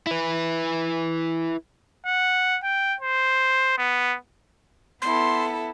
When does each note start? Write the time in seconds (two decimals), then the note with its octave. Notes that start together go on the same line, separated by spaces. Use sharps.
0.07 E4 B4
2.06 F#5
2.63 G5
3.01 C5
3.78 B3
5.02 B3 E4 A4 C6